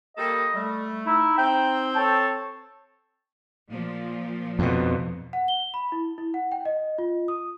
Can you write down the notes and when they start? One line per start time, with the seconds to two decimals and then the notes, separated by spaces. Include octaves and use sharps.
0.17 G3 A#3 A4 D#5
0.54 G3 A3
1.06 D#4 E4
1.38 C4 G5
1.96 A4 C#5 A5
3.69 A#2 F3
4.59 F2 B2
5.33 F#5
5.48 G7
5.74 B5
5.92 E4
6.18 E4
6.34 F#5
6.52 G5
6.65 D#5
6.98 F4
7.28 D#6